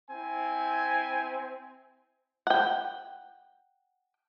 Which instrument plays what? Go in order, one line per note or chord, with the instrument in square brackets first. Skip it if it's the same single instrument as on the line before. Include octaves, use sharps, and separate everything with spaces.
[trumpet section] C4 E4 G#5
[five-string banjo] F#5 G5